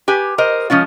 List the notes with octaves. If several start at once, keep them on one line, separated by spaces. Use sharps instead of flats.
G4 B4 G#5
A#4 C5 D#5
F3 G#3 C#4 F4